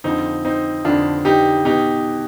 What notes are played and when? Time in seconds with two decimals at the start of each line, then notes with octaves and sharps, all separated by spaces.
0.04 F2 D3 F3 C4 D#4
0.45 C4 D#4
0.85 F2 D3 F3 D4 F4
1.25 D#4 G4
1.65 B2 D#4 G4